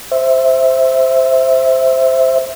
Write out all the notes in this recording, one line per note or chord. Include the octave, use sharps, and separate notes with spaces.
C5 E5